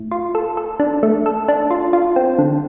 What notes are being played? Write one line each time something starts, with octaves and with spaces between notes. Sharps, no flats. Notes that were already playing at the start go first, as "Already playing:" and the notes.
Already playing: A2
F4
A4
A4
D4
A3
A4
D4
F4
F4
C4
D3